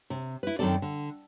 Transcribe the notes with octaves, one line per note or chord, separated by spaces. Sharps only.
C3
E4 B4
F#2 D#3 G#3 C4 A4 D5
D3